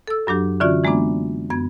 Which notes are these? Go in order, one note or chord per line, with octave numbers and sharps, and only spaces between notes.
A4 E6
F#2 F#3 D4 G4
D3 E3 C#4 F4 F#4 D5
E3 G#3 A#3 B3 D4
F#2 B3 G#6